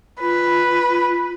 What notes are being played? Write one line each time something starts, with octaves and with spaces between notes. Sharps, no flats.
F4 B4